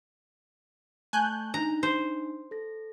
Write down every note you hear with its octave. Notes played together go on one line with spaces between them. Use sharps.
A3 G#5 A5 C#6 F#6 G6
D4 D#4 A#5
C5
A4 A#6